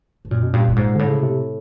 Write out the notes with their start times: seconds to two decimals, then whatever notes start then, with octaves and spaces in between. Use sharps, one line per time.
0.25 G2
0.31 F#2 A#2
0.42 B2
0.53 G2 A#2
0.69 G2
0.76 G#2
0.95 A2 D3
1.08 C#3
1.23 C3